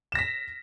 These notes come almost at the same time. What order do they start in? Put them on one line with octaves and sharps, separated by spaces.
E7 A#6 B6